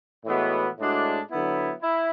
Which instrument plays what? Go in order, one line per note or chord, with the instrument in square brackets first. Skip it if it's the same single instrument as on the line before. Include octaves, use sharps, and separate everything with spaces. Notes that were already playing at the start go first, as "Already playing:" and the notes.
[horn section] A2 E3 G#3 B3 F#4
A2 G#3 D4 F#4
D3 F#3 B3 E4
E4